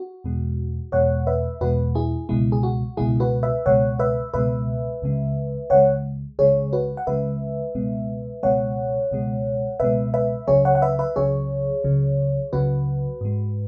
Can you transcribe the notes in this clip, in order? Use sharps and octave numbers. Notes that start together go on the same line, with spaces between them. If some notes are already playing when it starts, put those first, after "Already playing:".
Already playing: F#4
E2 B2 G#3
E2 B2 G#3 C#5 F#5
B4 E5
E2 B2 G#3 F#4 B4
E4 G#4
C#2 B2 G#3 E4
G#4
F#4
C#2 B2 G#3 E4 G#4
F#4 B4
B4 E5
C#2 B2 G#3 C#5 F#5
B4 E5
C#2 B2 G#3 B4 E5
C#2 C#3 G#3
C#2 C#3 G#3 C#5 F#5
C#2 C#3 G#3 G#4 C#5
F#4 B4
F#5
C#2 C#3 G#3 B4 E5
C#2 B2 G#3
C#2 B2 G#3 C#5 F#5
C#2 B2 G#3
C#2 B2 G#3 B4 E5
B4 E5
C#2 C#3 F#3 G#4 C#5
C#5 F#5
F#5
B4 E5
B4 E5
C#2 C#3 F#3 G#4 C#5
C#2 C#3 F#3
C#2 C#3 F#3 F#4 B4
G#2 G#3